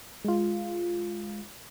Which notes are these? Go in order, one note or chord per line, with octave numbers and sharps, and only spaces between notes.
G#3 F4